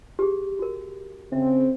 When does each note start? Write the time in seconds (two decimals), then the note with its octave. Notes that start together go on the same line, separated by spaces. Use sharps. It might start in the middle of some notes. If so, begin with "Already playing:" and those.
0.19 G4 G#4
0.59 F#4 A#4
1.33 C#3 C4 E5